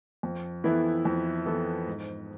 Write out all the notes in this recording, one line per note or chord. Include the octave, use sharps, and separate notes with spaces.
F2
E3 B3 E4 A4
F2
E3 B3 E4 A4
G#2